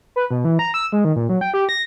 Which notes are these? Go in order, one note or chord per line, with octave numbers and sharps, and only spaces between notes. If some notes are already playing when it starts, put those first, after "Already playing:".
B4
B2
E3
A#5
E6
G#3
D#3
A#2
F#3
G5
G4
A#6